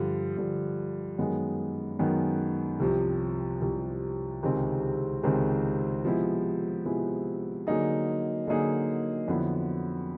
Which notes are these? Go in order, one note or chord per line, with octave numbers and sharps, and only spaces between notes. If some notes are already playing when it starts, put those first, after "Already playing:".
Already playing: G2 D3 F3
G2 D3 F3
F#2 D#3 G#3 B3
F#2 D#3 G#3 B3
C2 C3 F3
C2 C3 F3
C#2 C3 D#3 G#3 C4
C#2 C3 D#3 G#3 C4
C3 F3 G#3 B3 E4
C3 F3 G#3 B3 E4
D3 F#3 A#3 D#4 G#4
D3 F#3 A#3 D#4 G#4
F2 D3 F#3 B3 E4